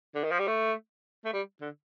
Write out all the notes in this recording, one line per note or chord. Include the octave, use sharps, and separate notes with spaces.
D3
D#3
F3
G3
A3
A3
G3
D3